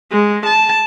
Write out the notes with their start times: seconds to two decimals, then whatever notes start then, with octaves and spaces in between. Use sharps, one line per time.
0.11 G#3
0.46 A5